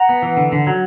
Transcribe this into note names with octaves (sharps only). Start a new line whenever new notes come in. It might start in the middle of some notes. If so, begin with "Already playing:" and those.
Already playing: F#5 A#5
B3
E3
D3
D3
F#3